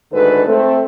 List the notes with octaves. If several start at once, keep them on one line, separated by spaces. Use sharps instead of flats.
D2 G#2 D#3 A4 B4
A3 C4 A4